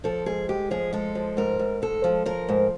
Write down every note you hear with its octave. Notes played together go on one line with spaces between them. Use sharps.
F3 A4
G#2 G#4
G#3 G4
F3 G#4
G#3 A4
F3
G#2 A#4
G#2
G#3 A4
F3
F3 A#4
G#2